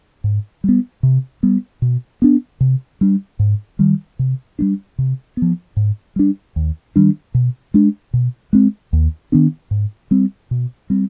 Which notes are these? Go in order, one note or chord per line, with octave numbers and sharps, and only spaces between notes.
G#2
G3 B3
C3
G3 B3
B2
B3 D4
C3
G3 D4
G#2
D#3 G3
C3
G3 B3 D4
C3
F3 B3
G#2
G3 D4
D#2
D#3 G3 D4
B2
G#3 D4
B2
G#3 C4
D#2
D#3 B3 D4
G#2
G3 C4
B2
G3 C4